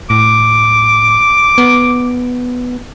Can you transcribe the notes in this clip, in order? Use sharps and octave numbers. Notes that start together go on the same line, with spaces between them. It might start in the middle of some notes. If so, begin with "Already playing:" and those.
A2 D6
B3